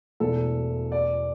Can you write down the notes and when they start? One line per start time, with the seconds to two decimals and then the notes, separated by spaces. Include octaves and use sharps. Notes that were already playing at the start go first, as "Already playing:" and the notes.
0.20 E1 E2 B2 A3 A4
0.92 D5